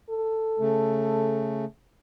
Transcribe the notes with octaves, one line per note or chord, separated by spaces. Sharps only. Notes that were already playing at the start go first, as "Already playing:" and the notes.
A4
C#3 A3